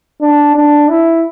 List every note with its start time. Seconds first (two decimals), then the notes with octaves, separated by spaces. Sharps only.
0.21 D4
0.55 D4
0.89 E4